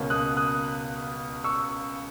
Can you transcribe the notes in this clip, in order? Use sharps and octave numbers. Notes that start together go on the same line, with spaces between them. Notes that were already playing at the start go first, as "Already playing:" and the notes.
Already playing: C#2 B2 A#3 C#4
D#6 F#6
D#6 F#6
C#6 E6